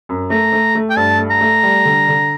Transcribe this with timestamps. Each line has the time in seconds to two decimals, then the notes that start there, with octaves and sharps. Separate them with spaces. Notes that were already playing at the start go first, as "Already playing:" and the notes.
0.09 F#2
0.30 A3 A#5
0.52 A3
0.75 A3
0.90 G5
0.97 G2 A5
1.19 A3
1.31 A#5
1.41 A3
1.63 G3
1.85 D3
2.08 D3